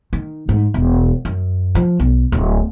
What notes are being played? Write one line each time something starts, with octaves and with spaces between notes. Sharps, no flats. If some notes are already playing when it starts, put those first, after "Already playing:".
D#3
G#2
E1
F#2
F3
B1
D1